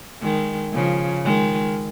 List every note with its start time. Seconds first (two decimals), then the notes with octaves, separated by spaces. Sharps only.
0.22 D#3 G#3
0.73 C#3 F3
1.25 D#3 G#3